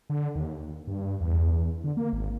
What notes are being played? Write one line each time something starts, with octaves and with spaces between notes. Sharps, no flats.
D3
D#2
G2
E2
D3
A#3
G#1